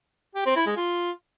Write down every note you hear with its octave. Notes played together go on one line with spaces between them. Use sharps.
G4
C4
E4
G#3
F4